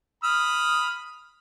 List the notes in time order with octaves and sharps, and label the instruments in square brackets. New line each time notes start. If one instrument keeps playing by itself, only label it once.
[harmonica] B5 D#6 F6